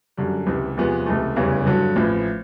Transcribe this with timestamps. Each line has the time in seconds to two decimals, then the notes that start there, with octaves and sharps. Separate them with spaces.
0.17 F#2 D3 G3
0.47 C#2 C3 E3
0.77 E2 C3 F3 G#3 B3
1.06 C#2 C3 E3 A3
1.36 F1 E2 C#3 E3 G3
1.66 G2 D3 F#3
1.96 A1 A2 F3